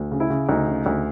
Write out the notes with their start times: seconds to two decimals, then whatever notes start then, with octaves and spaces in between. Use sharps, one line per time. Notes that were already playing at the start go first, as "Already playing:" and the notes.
Already playing: D2
0.11 C#3
0.20 E4
0.30 C#3
0.49 D2 D#4
0.67 C#3
0.86 D2